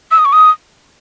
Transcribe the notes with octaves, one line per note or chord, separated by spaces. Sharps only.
E6
D#6
C#6
D#6